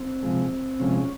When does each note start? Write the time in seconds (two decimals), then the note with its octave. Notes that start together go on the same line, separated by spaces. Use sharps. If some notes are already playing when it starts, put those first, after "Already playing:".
Already playing: C4
0.23 C3 F3 G#3
0.80 C3 F3 G#3 C#4